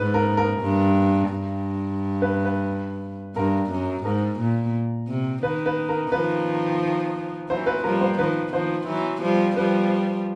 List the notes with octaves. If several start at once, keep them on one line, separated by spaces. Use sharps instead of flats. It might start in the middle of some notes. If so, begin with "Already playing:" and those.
Already playing: G#2 B4
A#4
A#4
G2
G2
B4
B4
G2 A#4
F#2
G#2 A#4
A#2
C3
D#3 B4
B4
A#4
D#3 F3 B4
E3 F#3 C5
B4
F3 G3 A#4
C5
D#3 F3 B4
D#3 F3 C5
E3 F#3
F3 G3
F3 G3 B4